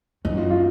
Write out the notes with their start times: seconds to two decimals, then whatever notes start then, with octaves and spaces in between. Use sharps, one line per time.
0.25 F#2 D#4
0.37 F4
0.50 F4